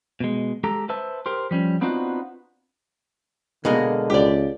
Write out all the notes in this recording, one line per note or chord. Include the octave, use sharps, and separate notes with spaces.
B2 G#3
G#3 G4 A4 A#5
B4 C5 E5 A5
G4 A#4 C5
F3 G3 C#4
B3 C4 D4 D#4 F4 F#4
B2 D3 G#3 A#3
C#2 G4 D5